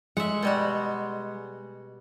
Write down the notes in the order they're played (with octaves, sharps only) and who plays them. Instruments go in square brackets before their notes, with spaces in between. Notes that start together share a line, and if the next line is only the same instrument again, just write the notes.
[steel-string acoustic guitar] G#3 [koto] E5 F#5
[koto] B2 G3 F#4